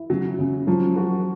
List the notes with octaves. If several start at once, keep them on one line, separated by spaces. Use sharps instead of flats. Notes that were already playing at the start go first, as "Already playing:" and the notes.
Already playing: E4
C#3 F#3
C#3
F3 F#3
F#4